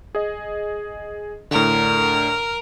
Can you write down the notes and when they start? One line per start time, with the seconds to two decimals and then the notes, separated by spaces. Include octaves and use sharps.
0.15 G#4 D#5
1.51 A2 D3 A#4